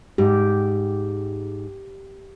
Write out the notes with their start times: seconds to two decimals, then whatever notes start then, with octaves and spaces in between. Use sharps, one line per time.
0.18 G#2 G4